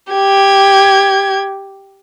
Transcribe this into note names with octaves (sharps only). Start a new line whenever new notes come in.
G4 G#6